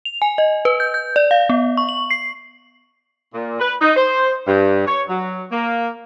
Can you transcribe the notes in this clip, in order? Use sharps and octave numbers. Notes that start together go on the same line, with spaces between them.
F7
G#5
D#5
B4
G6
G6
D5
F5
B3
C#6
F#7
C7
A#2
B4
D#4
C5
G2
C#5
F#3
A#3